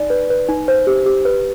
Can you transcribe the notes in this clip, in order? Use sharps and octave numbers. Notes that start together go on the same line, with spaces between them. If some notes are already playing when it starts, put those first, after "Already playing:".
Already playing: D#4 D5
B4
B4
D#4
C5
G4
G4
B4